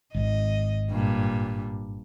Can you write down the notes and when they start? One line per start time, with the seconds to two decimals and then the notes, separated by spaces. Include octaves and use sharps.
0.15 G#1 D#5
0.91 G2 A#2